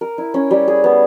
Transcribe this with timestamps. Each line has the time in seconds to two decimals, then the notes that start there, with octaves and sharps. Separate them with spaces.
0.01 A#4
0.18 E4
0.34 C#4
0.51 G3
0.68 G#4
0.84 B3